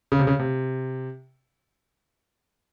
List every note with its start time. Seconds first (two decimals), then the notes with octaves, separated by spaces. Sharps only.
0.12 C#3
0.19 C3
0.27 C#3
0.39 C3